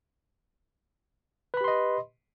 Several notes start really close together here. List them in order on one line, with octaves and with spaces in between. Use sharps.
B4 B5 G4 C6 D#5